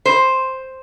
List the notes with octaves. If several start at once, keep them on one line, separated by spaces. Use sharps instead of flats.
C5